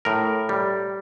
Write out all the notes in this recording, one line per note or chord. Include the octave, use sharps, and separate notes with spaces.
A2 A#4
G3